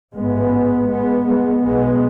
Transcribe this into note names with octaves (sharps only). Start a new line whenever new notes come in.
A1 G#2 G#3 B3
G#3 B3
G#3 B3
B1 B2 G#3 B3